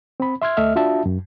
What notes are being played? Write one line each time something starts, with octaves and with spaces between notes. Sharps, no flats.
C4 B5
E5 C6 F6 G#6
D2 A3 D#5 E5 F6
D4 F4 F#4 E5 A5
F#2